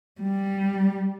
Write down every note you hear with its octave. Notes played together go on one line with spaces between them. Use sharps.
G3